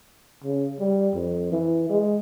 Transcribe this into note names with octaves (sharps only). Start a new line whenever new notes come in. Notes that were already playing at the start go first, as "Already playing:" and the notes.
C#3
G3
F2
E3
G#3